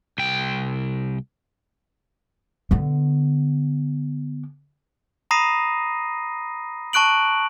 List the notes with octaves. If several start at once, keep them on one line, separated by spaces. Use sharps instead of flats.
C2 G5
D3 B3
A#5 B5 D#6 A#6 C7 D#7
A5 C#6 F#6 D7 F#7